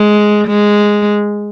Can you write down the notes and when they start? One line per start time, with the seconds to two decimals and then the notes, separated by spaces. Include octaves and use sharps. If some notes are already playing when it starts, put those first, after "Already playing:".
Already playing: G#3
0.47 G#3